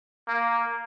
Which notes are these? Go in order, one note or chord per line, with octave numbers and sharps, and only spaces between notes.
A#3